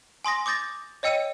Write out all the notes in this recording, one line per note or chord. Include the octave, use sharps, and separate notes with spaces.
G#5 C6 D#6 A#6
D6 D#6 G6 A6 A#6
C#5 D#5 G5 E6 C#7 D#7